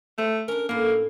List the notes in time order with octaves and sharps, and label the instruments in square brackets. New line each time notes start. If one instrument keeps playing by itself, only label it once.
[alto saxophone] A3 [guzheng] C5
[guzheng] C#4 D4 [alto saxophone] A#4
[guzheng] A2 B3 [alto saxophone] A#3